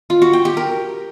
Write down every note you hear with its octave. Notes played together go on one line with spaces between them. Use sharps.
F4
F#4
G5
G4
A#4